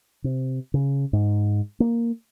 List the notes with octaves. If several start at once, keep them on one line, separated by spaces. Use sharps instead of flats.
C3
C#3
G#2
A#3